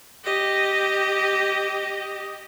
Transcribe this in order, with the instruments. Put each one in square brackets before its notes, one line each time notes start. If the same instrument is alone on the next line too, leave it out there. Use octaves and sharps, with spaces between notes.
[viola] G4 D#5